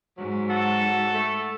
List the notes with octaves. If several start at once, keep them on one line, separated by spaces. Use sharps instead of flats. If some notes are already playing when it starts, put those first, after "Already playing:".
G#2 F#3
F#4 A4
A3